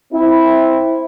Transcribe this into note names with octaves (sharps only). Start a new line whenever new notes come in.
C4 E4